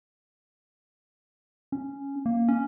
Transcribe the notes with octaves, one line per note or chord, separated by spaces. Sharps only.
C#4
A#3
C#4